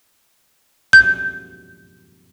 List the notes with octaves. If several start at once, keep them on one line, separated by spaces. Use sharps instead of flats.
G6